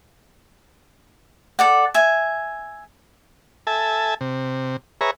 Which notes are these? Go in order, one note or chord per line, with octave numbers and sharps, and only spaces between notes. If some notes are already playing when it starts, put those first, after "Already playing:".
A4 D5 F#5
E5 G#5
A4 E5 G#5 A5
C3
G#4 B4 C#5 E5 A#5